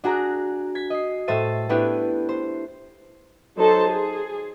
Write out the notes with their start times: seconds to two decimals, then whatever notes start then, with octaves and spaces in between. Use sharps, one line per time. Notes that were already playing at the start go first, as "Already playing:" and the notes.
0.04 D4 F#4 G#4 A#5
0.75 G#6 B6
0.90 D#5 C7
1.28 A2 A3 C5 E5 A6 D#7
1.69 A3 B3 D4 E4 G4
2.29 C5
3.56 F#3 D#4 A4 C5 A5
3.88 G#4